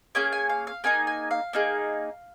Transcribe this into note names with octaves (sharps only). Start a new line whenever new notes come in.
A#3 C#4 G#4 G#5
G#5
F5
F5
A#3 D#4 G#4 G#5
G#5
F5
A#3 D#4 G#4